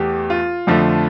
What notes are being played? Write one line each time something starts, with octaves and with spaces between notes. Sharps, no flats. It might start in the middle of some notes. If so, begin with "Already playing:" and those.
Already playing: E2 E3 A3 G4
F4
F2 D3 F3 A3